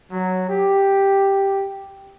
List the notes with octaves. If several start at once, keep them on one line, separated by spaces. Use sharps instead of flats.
F#3
G4